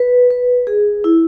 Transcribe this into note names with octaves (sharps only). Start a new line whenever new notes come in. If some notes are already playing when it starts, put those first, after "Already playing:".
Already playing: B4
B4
G#4
E4